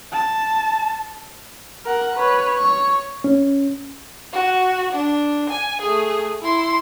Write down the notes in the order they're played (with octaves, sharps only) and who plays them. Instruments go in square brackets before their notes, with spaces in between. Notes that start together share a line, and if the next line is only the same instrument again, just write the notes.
[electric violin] A5
A#4 F#5
B4 C#5
C#5 C#6
[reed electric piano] C#4
[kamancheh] F#4
D4
G#5
A3 G#4
E4 C6